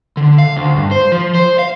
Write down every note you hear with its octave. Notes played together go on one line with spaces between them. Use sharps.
D3
F5
D2
G2
C5
F3
C5
F5